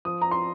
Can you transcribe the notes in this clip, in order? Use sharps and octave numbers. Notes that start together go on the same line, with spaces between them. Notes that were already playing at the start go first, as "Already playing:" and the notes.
F3 D#6
A#5
C6